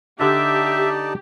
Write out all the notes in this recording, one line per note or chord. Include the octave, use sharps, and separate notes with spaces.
D3 D4 D#4 G4 D5 E5 A5